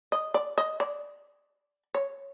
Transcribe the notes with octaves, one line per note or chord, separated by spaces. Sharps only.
D#5
D5
D#5
D5
C#5